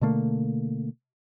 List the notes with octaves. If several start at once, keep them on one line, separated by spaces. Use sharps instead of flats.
B2 D3 A3 A#3